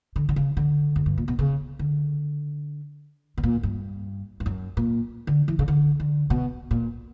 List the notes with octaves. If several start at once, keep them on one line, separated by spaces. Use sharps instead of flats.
D3
D3
C#3
D3
F#2
G2
A#2
B2
C#3
D3
B2
A#2
G2
G2
F#2
A#2
D3
E3
C#3
D3
D3
B2
A#2